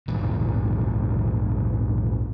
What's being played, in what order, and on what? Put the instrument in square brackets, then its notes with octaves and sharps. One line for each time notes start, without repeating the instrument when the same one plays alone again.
[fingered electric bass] A#1 E2 G#2